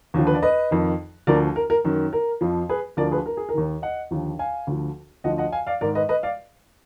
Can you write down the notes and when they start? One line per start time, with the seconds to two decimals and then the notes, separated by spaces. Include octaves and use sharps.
0.14 D#2 D3 F3
0.27 B4
0.35 D5
0.42 B4 D#5
0.71 F2 D#3
1.27 D2 D3 F3 A#4 D5
1.56 A#4
1.70 A#4
1.85 F#2 D#3
2.13 A#4
2.41 F2 F3
2.69 G#4 B4
2.97 D2 D3 F3 A#4 D5
3.11 G#4 B4
3.26 A#4
3.37 G#4
3.49 A#4
3.54 D#2 D#3
3.82 D#5 F#5
4.11 D#2 D3 F3
4.39 F5 G#5
4.67 D2 D3 F3
5.24 D2 D3 F3 D#5 F#5
5.38 D#5 F#5
5.52 F5 G#5
5.67 D5 F5
5.81 G#2 D#3 A#4 D5
5.95 B4 D#5
6.09 B4 D#5
6.23 D5 F5